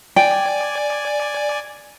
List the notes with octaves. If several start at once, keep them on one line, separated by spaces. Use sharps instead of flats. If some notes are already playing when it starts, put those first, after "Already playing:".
D5 G5 G#5